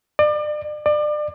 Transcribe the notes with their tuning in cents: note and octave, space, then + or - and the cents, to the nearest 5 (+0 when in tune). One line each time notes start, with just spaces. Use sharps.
D5 +35
D5 +30